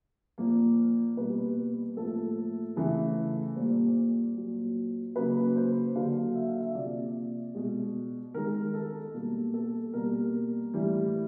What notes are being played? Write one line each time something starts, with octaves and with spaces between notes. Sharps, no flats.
A#2 F3 A#3
B2 G3 A#3 B4
A2 F3 A#3 A4
C#3 E3 A3
A#2 G3 A#3 C5
A#2 F#3 A#3
C#3 F#3 A#3 B4
C5
D3 F#3 A#3 F5
E5
F5
E5
C3 F3 A#3 D5
B2 G#3
D#3 G#3 A#4
A4
B2 G3 A#3
A4
B2 G3 A#3 A#4
A2 E3 G3